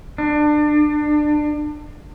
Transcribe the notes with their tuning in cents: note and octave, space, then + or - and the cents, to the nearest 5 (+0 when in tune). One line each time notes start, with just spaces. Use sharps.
D4 +25